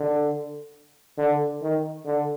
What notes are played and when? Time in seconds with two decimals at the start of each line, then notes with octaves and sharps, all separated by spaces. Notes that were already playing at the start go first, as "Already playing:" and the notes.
Already playing: D3
1.18 D3
1.62 D#3
2.06 D3